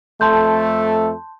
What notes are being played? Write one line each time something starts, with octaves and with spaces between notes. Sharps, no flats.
F2 A3 A4 A5 C6 G6